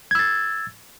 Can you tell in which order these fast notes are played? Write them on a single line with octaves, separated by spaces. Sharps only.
G#6 E6 A6